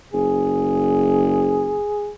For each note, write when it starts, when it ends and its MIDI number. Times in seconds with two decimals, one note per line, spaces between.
0.13 1.84 30
0.13 2.11 68